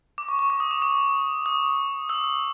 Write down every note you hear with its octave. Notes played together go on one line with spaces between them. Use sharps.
D6
C#6
C#6
D6
D#6
D6
D6
D#6
E6